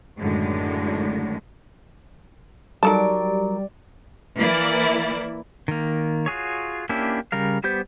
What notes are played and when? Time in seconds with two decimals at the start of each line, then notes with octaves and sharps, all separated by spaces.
0.18 F#2 A2 D3 D#3 G#3
2.83 F#3 G3 D#4 A4 A#4 D5 A5
4.38 E3 A#3 E4 D5
5.68 D#3 A#3
6.26 F4 F#4 G#4 C#5
6.89 A#3 C#4 D4 E4 G4
7.32 C#3 G3 A#4 F5
7.64 G3 B3 G4 C5 G6